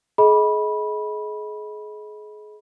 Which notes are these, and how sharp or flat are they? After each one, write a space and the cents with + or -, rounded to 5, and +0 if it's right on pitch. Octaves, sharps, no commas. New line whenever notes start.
G#4 +35 D#5 +20 B5 -15